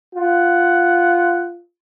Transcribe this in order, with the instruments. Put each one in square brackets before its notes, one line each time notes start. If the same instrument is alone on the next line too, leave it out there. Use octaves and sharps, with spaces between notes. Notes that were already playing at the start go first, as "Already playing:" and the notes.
[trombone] F4 [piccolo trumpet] F#5